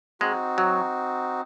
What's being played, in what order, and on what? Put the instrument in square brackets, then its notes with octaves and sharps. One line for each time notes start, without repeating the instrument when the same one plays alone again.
[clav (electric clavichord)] G#3 [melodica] C4 D#4 F#4
[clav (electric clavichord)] F#3